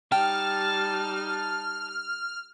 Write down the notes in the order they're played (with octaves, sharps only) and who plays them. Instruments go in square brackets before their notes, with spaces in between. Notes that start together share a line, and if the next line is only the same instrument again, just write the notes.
[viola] G3 D#4 [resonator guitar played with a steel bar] G5 [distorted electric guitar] A5 [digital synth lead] F6